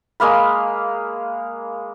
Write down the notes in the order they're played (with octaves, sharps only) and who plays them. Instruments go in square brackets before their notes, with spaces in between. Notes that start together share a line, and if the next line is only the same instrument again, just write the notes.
[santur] G#3 A#3 F5 B5